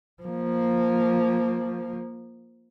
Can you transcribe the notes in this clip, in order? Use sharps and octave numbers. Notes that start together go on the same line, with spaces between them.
F3 A#3